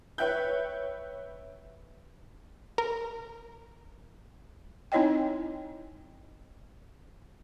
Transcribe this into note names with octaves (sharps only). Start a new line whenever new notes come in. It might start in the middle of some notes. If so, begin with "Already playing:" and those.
B4 C#5 E5 G5 F#6 G6
A#4
C4 D#4 E4 C#5 D#5 G5